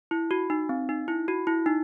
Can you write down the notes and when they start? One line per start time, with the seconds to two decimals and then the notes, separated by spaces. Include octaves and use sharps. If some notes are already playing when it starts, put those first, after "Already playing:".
0.11 E4
0.31 F#4
0.50 D#4
0.69 C4
0.89 D#4
1.08 E4
1.28 F#4
1.47 E4
1.66 D#4